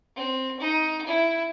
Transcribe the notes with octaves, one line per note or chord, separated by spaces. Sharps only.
C4
D#4
E4